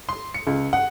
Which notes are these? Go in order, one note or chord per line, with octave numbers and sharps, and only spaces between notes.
C6
C#7
C#2
F#5